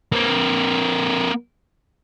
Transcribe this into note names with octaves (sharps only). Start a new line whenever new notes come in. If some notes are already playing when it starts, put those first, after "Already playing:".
A#3 C4